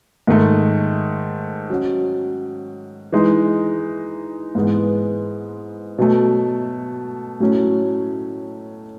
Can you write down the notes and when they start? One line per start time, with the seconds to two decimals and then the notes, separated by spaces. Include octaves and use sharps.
0.27 G#2 D#3 A3
1.70 F#3 C#4 F#4
3.12 E3 G#3 D#4
4.55 G#2 E3 G#3 B3
5.98 B2 F#3 A3
7.40 A2 F#3 A3 C#4